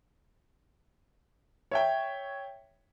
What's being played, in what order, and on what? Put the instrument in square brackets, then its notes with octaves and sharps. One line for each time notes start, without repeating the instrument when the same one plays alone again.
[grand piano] C#5 E5 G5